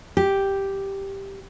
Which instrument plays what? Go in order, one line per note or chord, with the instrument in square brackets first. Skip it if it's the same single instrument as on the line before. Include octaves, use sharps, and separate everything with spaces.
[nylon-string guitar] G4